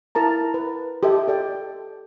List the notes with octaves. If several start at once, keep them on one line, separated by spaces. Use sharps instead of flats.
E4 A#4 A5 A#5
B4
G4 A4 D#5 E5
A4 D5 G5